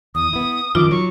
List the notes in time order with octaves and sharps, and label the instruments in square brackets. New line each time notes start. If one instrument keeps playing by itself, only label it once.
[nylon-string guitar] E2 [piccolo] D#6
[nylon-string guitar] B3 E4
[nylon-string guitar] F#2 D#3 F3 [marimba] F4 [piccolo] D6
[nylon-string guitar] F#3 [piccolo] C#6